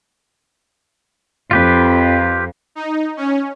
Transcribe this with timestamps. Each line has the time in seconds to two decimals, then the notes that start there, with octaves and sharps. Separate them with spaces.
1.51 F2 F4 G4 B4
2.75 D#4
3.17 C#4